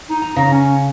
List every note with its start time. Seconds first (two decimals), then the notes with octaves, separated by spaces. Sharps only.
0.09 D#4
0.22 A#5
0.36 C#3 A#5
0.51 C#4